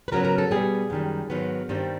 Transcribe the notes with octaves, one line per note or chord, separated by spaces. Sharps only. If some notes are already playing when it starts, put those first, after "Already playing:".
B4
C#3 F#3 B3 A#4
A#4
A4
B2 G3 B3 G#4
F#2 D#3 G3
G#2 D#3 F#3 B3
G2 D#3 G3 C4